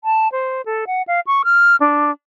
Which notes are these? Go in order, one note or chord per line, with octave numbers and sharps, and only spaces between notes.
A5
C5
A4
F#5
F5
C#6
F6
D4